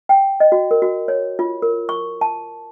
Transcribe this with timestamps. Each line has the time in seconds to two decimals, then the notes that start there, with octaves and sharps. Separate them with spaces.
0.09 G5
0.40 D#5
0.52 F#4
0.71 A#4
0.82 F#4
1.08 C#5
1.39 F4
1.62 A#4
1.89 C#6
2.21 A5